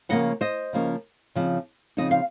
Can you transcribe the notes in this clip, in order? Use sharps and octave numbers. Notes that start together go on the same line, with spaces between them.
C#3 F3 A#3 C#4 D#5 F#5
C5 D#5
C#3 F3 A#3 C#4
C#3 F3 C4 D#4
C#3 F3 C4 D#4 D#5
F5